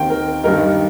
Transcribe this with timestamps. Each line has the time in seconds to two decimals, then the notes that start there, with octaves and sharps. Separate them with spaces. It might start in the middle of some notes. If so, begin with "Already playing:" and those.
Already playing: D#2 D#3 C4 G5
0.10 A#4
0.44 G2 D#3 G3 D#4 A#4